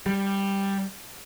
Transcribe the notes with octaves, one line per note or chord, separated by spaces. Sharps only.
G3